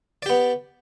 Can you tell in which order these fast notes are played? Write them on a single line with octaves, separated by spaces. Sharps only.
D5 G4 B3